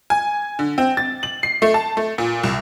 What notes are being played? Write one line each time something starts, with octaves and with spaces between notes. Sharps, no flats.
G#5
D3
C4
A6
F#7
C7
A3
A5
A3
A#2
C2